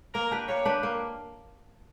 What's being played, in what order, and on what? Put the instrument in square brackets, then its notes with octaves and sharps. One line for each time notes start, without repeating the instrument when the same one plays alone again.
[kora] A#3 [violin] A#4
[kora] D4 G4 B4
[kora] A#3 [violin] C#5
[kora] D4 G4 B4
A#3